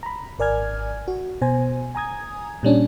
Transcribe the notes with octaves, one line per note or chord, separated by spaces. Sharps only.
A#5 B5
G#1 A#4 D5 G#5 F6 G#6
F#4
B2 C5 G#5
G#5 A#5 D#6 G#6
A#2 G3 C#4 D4